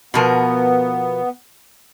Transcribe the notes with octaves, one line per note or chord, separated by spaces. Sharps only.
B2 F3 B3 A#4